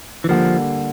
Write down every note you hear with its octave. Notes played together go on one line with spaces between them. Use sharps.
E3
D3 F3 G3 A#3